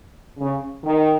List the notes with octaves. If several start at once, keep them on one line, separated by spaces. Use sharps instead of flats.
C#3
D#3